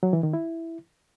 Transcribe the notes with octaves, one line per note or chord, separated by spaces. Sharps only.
F#3
E3
D#3
E4